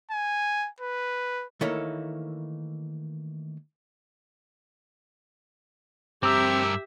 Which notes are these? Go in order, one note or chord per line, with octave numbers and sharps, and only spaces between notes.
G#5
B4
D#3 E3 A3 A#3 E4 C#5
G2 C4 G4 A#4 E5 D6 E6